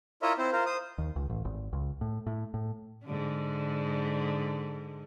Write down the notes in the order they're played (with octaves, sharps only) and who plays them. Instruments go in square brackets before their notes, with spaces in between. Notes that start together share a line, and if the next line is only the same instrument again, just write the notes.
[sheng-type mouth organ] E4 F4 A#4 C#5 D#5 E5
C4 E4 C5
F4 A#4 C5
C5 D#6
[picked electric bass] D#2
C#2
A1
G#1
C#2
A2
A2
A2
[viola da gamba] G#2 D3